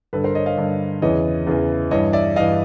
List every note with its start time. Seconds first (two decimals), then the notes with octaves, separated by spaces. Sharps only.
0.13 G2 D3 A4 B4
0.24 A#4 C5
0.35 C#5 D#5
0.46 D#5 F5
0.57 G2 D3
1.02 E2 C#3 E3 C#5 D#5
1.47 E2 C#3 E3
1.91 G2 E3 C#5 D#5
2.13 D5 E5
2.35 G2 E3 D#5 F5